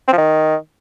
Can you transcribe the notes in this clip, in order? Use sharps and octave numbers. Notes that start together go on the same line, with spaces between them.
C4
F3
D#3